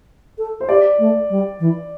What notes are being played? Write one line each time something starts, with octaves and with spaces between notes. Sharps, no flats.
A4
C5
G4 D5
A3
G3
E3